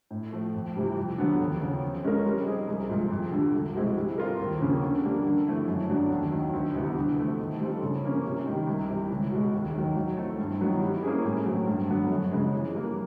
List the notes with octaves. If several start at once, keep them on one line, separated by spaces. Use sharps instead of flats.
A2
F3 A3
F2
C3 E3 G3 C4
F2
D3 F#3 B3
D#2
C#3 F3
F3
G#3 C#4 F4 A#4
G3
C4 D#4 G#4
C2
A#2 F3 G#3
F2
D3 G3
C2
B2 G#3 C4 E4
G3
C4 F4 A#4
D#2
C#3 F3 A#3 C#4
D3
G3 A#3 D4
D3
F3 A3 C4 E4
F#2
D3 F#3 B3 D4
D#2
D#3 F#3
D2
C3 E3 G3 B3
D3
F3 A3 C4
D#3
G3 C4 F4 A4
C#3
F3 A#3 C#4
C3
D#3 G3
C2
C3 E3
C#2
B2 G#3
D#2
D#3 F#3
F#3
A3 C4 E4 A4
G2
D#3 F#3 B3 E4
G3
A#3 C#4 E4 G#4
A2
F#3 A3 C4
G2
D3 F#3 B3
F#2
C#3 F3 G#3
E3
G3 A#3